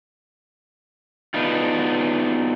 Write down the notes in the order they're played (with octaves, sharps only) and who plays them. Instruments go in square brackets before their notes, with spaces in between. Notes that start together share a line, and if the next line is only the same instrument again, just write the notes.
[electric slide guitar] B3 D4 D#4 F4